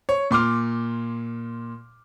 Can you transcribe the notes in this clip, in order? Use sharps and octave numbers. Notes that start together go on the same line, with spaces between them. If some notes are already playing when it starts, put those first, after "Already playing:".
C#5
A#2 C6 D6 F6